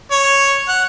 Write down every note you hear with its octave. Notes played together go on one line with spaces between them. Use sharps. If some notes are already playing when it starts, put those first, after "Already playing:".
C#5
F#5